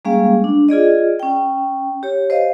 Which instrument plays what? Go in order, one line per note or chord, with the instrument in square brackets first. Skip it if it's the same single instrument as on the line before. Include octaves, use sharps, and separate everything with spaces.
[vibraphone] G3 G#3 A#3 C#4 G#4 F5
D4
F4 G#4 D5 D#5
C#4 G5
G4 C#5
C5 D#5 F5